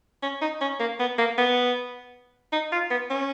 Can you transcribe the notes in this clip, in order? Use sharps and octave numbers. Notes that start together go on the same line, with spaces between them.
C#4
D#4
C#4
A#3
B3
A#3
B3
D#4
F4
B3
C#4